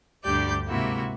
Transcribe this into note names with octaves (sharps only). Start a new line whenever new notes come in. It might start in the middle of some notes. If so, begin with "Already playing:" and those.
D2 G2 D4 G4 D5 G6
G#2 C3 A#3 E4 F#4